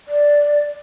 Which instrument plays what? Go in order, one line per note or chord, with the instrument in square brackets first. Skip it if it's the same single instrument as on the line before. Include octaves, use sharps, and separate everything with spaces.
[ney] D5